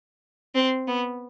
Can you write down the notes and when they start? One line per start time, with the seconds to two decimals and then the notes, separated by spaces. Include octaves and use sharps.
0.55 C4
0.87 B3